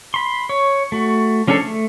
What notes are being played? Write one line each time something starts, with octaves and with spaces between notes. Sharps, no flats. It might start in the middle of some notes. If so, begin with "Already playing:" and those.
B5 C6
C#5
A3 F#4
F3 C#4 D4 G#4 A4
A3